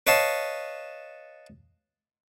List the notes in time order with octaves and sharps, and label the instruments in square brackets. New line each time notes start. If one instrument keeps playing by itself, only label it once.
[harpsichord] B4 C#5 D#5 F5 A5